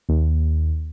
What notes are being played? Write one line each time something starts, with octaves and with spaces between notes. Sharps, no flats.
D#2